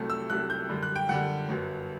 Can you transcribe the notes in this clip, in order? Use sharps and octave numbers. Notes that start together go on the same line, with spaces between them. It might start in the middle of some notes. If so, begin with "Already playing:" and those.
Already playing: C2 C3 F#3 A3
E6
C2 C3 F#3 A3 F#6
G6
F#2 D3 G3
F#6
G5
F#2 D3 G3 F#5
G1 F#2 F#3